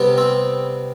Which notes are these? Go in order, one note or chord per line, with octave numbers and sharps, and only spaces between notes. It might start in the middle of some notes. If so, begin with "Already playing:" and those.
Already playing: C3 G3 B3
C4